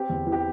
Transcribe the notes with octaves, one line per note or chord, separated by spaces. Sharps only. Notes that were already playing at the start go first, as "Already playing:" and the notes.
Already playing: C4 G4
E2
E3
G4